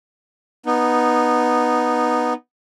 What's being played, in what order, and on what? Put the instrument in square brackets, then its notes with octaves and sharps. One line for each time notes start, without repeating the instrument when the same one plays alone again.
[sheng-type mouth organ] B3 D#4